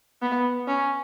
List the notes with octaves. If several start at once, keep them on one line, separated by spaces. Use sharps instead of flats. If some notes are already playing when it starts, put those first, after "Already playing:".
B3
C#4